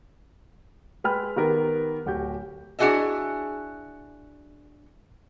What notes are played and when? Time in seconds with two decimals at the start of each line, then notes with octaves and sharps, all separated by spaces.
1.04 G#3 B4 G5 B5 F6
1.36 D#3 B3 G4 A#4 B4
2.06 D1 F#4 G4 G6
2.79 D4 E4 F#4 G#4 D#5 E5